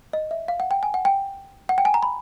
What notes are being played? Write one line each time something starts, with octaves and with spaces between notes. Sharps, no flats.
D#5
E5
F5
F#5
G5
G#5
F#5
G5
F#5
G5
G#5
A#5
B5